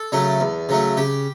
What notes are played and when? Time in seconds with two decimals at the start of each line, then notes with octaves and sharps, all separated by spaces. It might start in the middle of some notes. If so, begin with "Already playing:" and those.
Already playing: A4
0.12 C#3 F#3 A3
0.40 E2
0.69 C#3 F#3 A3
0.97 C#3 G4